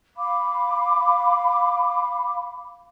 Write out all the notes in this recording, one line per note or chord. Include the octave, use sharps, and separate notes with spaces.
F5 B5 D6